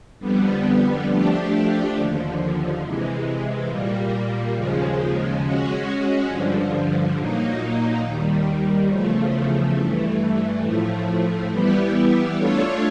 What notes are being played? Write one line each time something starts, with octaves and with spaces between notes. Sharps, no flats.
F2 D3 G3 B3
F3 A3 D4 G4
D#2 D3 F3
C3 E3 G#3
A#2 G3 A#3
D#2 C#3 F3 G#3
G#3 C#4 F#4
G2 D3 F3
A#2 F#3 A#3 D#4
D#2 D#3 G3
E2 C#3 F3 A3
G2 E3 A3
A2 F3 A3
E3 G3 B3 E4 G4
A3 D4 F4 A4 C#5